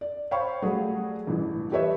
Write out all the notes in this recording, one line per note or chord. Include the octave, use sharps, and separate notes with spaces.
D5
C5 C#5 F5 G5 B5 C#6
F#3 G3 A3 F#4 G#4
A1 G2 E3
G4 A4 B4 C#5 D#5 E5